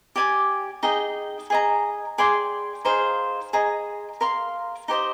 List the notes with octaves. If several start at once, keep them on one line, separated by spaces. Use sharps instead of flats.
G4 D5 G#5 D6
D#4 G#4 D#5 G5
G#4 D#5 A#5
G#4 D5 G5 C6
D#4 G#4 C5 F5
G#4 D#5 A#5
A#4 F5 C6
D#4 G4 C5 D#5